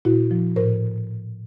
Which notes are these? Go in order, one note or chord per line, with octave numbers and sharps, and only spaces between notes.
A#2 E4 F#4
F3
A2 A#4 C5